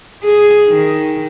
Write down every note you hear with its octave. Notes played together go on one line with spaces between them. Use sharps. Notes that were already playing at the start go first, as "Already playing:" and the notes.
G#4
D#3